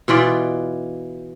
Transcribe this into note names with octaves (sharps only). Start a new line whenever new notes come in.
B2 E3 F4 D5